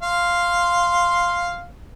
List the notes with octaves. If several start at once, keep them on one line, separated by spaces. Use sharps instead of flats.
F5 C6